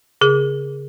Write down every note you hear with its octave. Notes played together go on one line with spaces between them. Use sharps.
C#3 G#4